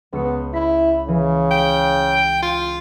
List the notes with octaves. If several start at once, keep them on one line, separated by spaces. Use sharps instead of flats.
C#2 B3 E6 C#7
E4 B6
C#3 E3
G5
F4